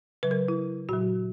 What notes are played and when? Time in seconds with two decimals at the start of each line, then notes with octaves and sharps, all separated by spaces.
0.23 C#3 F#3 B4
0.31 A#4
0.48 E4
0.89 A#2 F#3 F#4